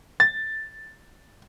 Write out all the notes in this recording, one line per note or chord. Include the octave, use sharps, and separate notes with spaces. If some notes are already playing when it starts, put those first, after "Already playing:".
A6